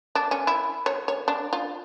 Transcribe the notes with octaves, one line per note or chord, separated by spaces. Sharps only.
D4
C#4
E4
C#5
C#5
D4
F4